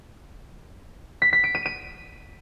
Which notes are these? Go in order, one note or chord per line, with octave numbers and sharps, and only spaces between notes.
B6
B6
D7
D#7
D#7